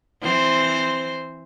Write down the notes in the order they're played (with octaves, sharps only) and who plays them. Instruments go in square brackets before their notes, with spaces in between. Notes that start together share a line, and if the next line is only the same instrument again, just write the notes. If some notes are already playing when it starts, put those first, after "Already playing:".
[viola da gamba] E3 C4 C5